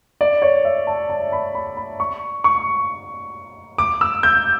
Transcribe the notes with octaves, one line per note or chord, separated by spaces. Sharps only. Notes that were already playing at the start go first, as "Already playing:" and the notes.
D5
C#5
E5
A5
A5
B5
B5
B5
C#6
C#6
D6
E6
G6